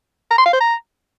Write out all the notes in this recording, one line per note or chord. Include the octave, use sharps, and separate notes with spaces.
A#5
C6
F5
C5
A#5